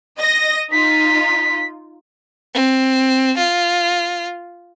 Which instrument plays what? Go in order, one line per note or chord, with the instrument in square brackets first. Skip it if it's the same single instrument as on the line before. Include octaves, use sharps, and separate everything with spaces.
[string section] D#5 A#6
[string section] D#4 F4 [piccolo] B6
[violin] C4
F4